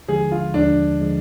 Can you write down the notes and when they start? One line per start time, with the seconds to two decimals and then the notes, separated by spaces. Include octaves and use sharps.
0.08 D#2 D3 F3 G#3 G#4
0.32 F4
0.54 D#2 D3 F3 G#3 D4
1.01 D3 F3 G#3